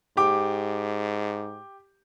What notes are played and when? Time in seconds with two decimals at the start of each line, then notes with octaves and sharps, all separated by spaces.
0.17 G#2 G4 D6